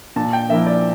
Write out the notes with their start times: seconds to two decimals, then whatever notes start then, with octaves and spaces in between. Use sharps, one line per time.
0.16 A#2 A5
0.33 G5
0.49 F3 A#3 E4 E5
0.66 D5